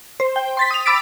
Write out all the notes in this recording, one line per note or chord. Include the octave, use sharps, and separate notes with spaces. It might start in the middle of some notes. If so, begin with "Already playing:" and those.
C5
G5
C6 A6 B6
D#6 F7
B5 D6 E6 A6 B6 D7